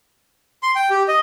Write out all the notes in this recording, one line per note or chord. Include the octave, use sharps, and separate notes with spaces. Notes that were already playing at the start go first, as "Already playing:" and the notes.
C6
G5
G4
D#5